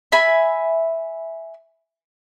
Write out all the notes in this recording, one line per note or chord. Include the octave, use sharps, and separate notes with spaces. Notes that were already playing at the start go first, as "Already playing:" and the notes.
E5 G#5 B5